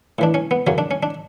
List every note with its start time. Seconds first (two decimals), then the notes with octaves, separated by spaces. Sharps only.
0.19 A2 E3 D4
0.34 C#4
0.51 B3
0.67 F#2 C#3 F#3 C#4
0.78 D4
0.91 C#4
1.03 D4